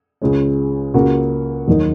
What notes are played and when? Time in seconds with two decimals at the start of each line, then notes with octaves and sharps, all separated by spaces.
0.22 C#2 C#3 G#3 C#4
0.94 C#2 C#3 A#3 F#4 A#4
1.68 D#2 D#3 F#3 D#4 A#4